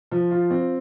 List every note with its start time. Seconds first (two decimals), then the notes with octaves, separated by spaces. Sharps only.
0.11 F3
0.31 F4
0.50 C4